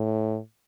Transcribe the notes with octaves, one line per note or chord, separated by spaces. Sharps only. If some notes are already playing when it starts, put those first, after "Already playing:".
Already playing: A2